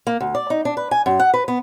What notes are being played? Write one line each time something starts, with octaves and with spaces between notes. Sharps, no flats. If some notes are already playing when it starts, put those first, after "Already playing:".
A#3
D2
D5
D#4
D4
B4
G#5
F#2
F#5
B4
B3